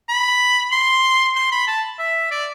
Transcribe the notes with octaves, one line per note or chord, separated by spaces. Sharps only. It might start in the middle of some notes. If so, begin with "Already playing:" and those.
B5
C6
C6
B5
A5
E5
D5